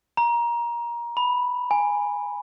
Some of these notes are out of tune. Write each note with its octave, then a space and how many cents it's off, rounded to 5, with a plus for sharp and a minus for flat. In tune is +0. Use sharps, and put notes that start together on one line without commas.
A#5 +20
B5 -5
G#5 -10